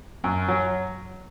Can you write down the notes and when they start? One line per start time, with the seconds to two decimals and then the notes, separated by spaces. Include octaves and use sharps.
0.24 F#2
0.48 F#3